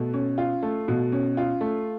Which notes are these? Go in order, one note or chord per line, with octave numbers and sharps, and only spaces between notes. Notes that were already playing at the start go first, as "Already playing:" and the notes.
Already playing: B2 A3
C#4
F4
A3
B2
C#4
F4
A3